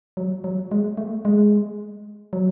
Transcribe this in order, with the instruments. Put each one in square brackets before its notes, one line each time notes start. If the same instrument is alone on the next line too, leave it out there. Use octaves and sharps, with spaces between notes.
[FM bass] F#3
F#3
G#3
A3
G#3
F#3